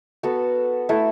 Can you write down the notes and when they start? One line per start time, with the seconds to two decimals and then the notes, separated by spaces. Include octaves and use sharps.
0.23 B3 F#4 A4
0.89 A3 E4 A4